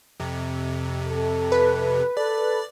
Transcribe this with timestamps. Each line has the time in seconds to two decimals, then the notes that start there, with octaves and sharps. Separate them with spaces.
0.20 F2 C3
1.08 A4
1.52 B4
2.17 A4 D5